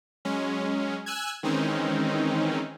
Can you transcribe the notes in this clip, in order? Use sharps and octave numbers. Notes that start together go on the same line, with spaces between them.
F#3 G#3 C#4
G#5 E6 F#6 G#6
D#3 E3 G#3 C4 C#4 D#4